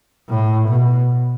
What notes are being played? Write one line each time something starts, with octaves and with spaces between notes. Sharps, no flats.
A2
B2